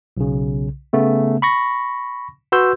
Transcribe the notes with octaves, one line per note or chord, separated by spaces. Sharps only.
B1 C#3
C#3 A3 B3
B5 C#6 A#6
F#4 B4 C6 E6 G6